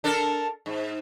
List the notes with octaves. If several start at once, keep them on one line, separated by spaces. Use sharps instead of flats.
D4 A4 A#4
G#2